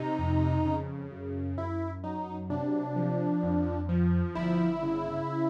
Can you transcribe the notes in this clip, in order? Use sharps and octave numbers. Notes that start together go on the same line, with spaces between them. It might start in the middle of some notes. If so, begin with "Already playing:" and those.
Already playing: C3 D#4
F2
C#3
F#2
F#2 E4
F#3 D#4
C3 D4
F3
F2
F3
G1 E4
C#3